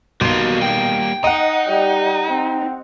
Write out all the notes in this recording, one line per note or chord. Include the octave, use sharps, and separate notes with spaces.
B1 G3 A#3 F#4 C6
G5
D#4 D#5 F#5
G3
C4